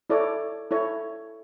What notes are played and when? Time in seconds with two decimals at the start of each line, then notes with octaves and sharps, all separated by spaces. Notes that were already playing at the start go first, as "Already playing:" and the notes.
0.10 E4 A4 C#5 D5
0.71 E4 A4 C#5